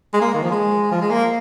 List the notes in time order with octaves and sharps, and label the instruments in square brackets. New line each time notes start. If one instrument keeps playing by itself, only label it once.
[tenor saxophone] G#3
A#3
D#3
F3
G#3
F3
G#3
A#3